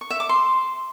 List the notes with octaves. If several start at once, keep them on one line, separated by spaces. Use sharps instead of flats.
C#6
E5
D6
C6